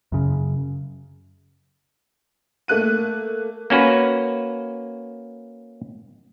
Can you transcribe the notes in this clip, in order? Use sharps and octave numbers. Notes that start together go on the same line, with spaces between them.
F#2 C#3
A3 A#3 F#6 D#7
A#3 C#4 F#4 B4